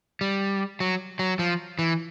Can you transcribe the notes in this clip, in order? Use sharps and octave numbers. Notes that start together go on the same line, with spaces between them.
G3
F#3
F#3
F3
E3